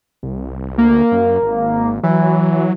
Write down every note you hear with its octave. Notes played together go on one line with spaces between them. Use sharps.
C2
D2 A#3
F#2
G#1
E3 F#3